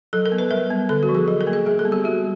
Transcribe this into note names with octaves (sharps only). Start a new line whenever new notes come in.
F#3 A4
A#4
B3
B4
G3 A#4
B3
D3 A4
F#4
F3
G#4
F#3 A4
A#4
A#3
G#4
G3 G#4
A4
B3
G4
G3 F#4